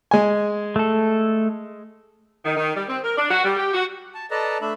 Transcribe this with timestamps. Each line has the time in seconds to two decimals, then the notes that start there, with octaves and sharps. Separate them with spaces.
0.11 G#3 G#5
0.76 A3 A4
2.45 D#3
2.57 D#3
2.75 G3
2.88 C4
3.03 A#4
3.17 D4
3.30 F#4
3.44 G3
3.56 G4
3.73 F#4
4.14 A5
4.31 A4 B4 D5 D#5 A5 A#5
4.61 A3 D4 E5 B5